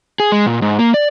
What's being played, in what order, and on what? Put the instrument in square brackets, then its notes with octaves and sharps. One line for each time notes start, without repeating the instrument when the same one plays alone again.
[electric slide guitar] G#4
G#3
A#2
G#2
A#3
D5